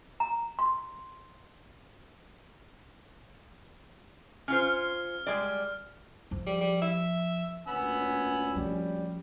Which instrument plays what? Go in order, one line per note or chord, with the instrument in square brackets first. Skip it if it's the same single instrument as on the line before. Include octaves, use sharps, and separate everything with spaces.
[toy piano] A#5
C6
[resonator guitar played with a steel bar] C#4 F4 C5 [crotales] F6
[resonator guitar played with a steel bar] G3 G#3 D5
[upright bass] F3
[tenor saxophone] G3
G3
E5
[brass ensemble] D2 A#2 C#4 [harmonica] B3 B5 E6 [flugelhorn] G#5
[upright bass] F3 [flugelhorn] G3